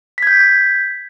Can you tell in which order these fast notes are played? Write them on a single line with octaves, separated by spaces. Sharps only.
B6 G#6 G6